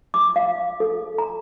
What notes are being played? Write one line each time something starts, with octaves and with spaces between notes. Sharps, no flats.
D6
F5
A4
A#5